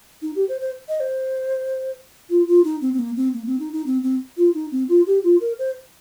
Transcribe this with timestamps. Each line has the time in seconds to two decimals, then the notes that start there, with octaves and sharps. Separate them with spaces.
0.22 D#4
0.36 G4
0.49 C5
0.61 C5
0.89 D#5
1.00 C5
2.30 F4
2.48 F4
2.64 D#4
2.82 C4
2.94 C4
2.99 A#3
3.17 C4
3.34 A#3
3.47 C4
3.60 D#4
3.73 D#4
3.86 C4
4.03 C4
4.37 F4
4.54 D#4
4.72 C4
4.89 F4
5.07 G4
5.24 F4
5.41 A#4
5.59 C5